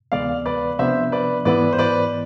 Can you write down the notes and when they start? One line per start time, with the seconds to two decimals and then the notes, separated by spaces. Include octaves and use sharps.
0.12 D2 C3 E3 G#3 B3 D5 F5
0.46 B4 D5
0.79 C3 F3 B3 D4 C5 E5
1.12 B4 D5
1.45 G#2 E3 B3 E4 B4 D5
1.73 C5
1.78 B4 D5